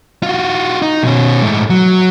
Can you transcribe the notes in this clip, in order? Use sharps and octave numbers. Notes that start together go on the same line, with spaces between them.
F4 F#4
D#4
B2 C#4
G#2 A3
F#3